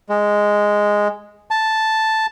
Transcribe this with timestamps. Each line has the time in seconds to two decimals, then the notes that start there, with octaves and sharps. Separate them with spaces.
0.09 G#3
1.51 A5